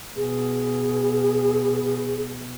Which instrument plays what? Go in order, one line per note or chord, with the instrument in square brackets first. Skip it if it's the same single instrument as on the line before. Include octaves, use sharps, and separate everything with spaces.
[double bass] B2 [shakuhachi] G#4